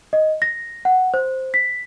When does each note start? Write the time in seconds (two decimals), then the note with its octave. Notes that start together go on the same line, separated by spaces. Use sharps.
0.13 D#5
0.42 A#6
0.85 F#5
1.14 C5
1.54 B6